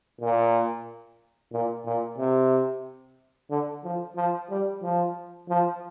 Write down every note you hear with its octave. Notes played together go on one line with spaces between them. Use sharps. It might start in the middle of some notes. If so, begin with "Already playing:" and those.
A#2
A#2
A#2
C3
D3
F3
F3
G3
F3
F3